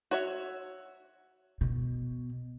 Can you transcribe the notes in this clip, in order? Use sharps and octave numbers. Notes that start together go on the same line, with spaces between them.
F#4 C#5 E5
B2